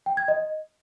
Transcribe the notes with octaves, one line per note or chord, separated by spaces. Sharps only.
G5
G#6
D#5